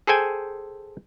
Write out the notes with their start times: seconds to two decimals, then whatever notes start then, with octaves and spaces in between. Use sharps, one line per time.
0.07 G#4 A4 C5 G5 G#5